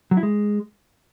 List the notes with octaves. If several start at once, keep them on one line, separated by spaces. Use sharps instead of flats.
F#3
E4
G#3